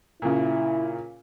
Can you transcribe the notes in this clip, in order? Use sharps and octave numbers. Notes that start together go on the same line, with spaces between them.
A#2 C#3 E4